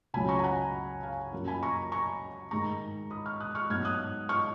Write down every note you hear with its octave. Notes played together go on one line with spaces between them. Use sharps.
C#2 C#3 F#3 C#4 G#5 B5
A#5 C#6
G#5
F#5 A#5
F5 G#5
F#2 F3 A#3 C#4
G#5 B5
A#5 C#6
A#5 C#6
G#2 D#3 G#3 A#5 C#6
B5 D#6
C#6 F6
D#6 F#6
C#6 F6
G#2 F#3 B3 D#4 F6 G#6
D#6 F#6
C#6 F6